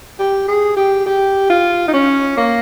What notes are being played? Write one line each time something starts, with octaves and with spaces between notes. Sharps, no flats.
G4
G#4
G4
G4
F4
D#4
C#4
A#3